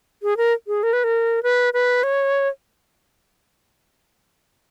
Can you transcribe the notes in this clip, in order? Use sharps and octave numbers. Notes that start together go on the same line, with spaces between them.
G#4
A#4
G#4
A#4
B4
A#4
B4
B4
C#5